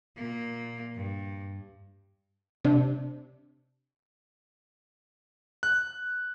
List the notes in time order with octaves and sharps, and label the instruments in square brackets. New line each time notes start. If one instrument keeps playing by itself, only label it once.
[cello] A#2 A#3
G2
[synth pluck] C3 D4
[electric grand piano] F#6